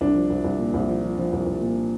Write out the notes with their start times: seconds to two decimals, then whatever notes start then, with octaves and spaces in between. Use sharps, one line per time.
0.01 C2 D4
0.15 F3
0.30 C2
0.44 C2
0.59 A#2
0.74 C2
0.88 F3
1.03 F3
1.18 F3
1.33 C2
1.46 C2
1.61 A#2